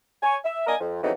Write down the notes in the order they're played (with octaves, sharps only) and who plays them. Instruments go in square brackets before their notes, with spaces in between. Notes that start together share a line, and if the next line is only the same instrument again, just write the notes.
[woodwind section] C#5 G#5
E5
A#3 D4 A#4 D#5 G#5 D#6
F2
F2 C#3 E3 F#3 B3 D#4